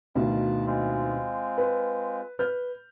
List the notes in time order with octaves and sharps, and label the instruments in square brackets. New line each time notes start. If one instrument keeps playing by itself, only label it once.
[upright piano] D2 B2 D#3 [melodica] F4 A5
[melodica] G#3 C4 F4
[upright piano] B4
B4 F6 G6